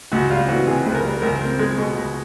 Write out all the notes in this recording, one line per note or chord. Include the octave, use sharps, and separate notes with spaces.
C#2 F#4
G3 F4
E3 F#4
C3 G#4
C#2 B4
A#4
G3
C#2 A#4
C4
G#3
B2
C#2